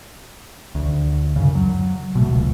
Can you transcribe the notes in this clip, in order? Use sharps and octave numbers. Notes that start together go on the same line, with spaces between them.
D2
F#2 C#3
F#3
B2 G3 A3
D#1 C#2